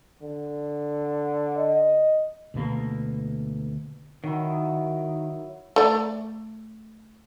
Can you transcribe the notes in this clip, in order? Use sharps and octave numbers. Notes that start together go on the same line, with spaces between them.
D3
D#5
D2 B2 A#3
D#3 F#3 E4
A3 D5